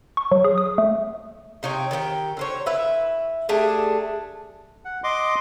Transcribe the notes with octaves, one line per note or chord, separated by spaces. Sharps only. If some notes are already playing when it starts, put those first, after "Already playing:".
C#6
F#3
G#4
D#6
A3
C3 D#4 C#5 G5
D#3 G4 B4 G5
D3 C5 C#5
E4 B4 E5
A3 D4 G4 G#4
F#5
D#5 C6 D6